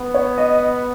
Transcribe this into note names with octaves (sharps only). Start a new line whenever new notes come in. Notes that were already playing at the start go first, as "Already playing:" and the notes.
Already playing: B3
C#5
D#5